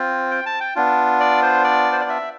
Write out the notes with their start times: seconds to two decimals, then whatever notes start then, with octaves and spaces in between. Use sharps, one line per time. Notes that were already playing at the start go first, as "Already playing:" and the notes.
Already playing: C4 F4
0.31 G5
0.46 A5
0.60 G5
0.76 B3 D4 F4
1.20 D5
1.43 C5
1.64 D5
1.92 C5
2.01 D5
2.09 E5